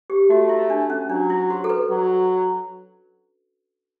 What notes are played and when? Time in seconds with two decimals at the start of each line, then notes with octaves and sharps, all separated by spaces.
0.10 G4
0.30 A3 F#4
0.49 E4
0.70 D4
0.90 C#4
1.10 F#3 D4
1.30 E4
1.50 F#4
1.64 A4
1.70 B4
1.90 F#3